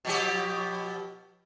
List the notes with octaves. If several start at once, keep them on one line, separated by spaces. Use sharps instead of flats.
B2 F3 G4